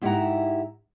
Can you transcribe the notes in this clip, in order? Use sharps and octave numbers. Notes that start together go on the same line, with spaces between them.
G#2 E4 G4 E5 F#5 A#5